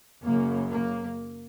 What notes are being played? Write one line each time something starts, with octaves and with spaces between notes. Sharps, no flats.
F#2 C#3 A#3
A#3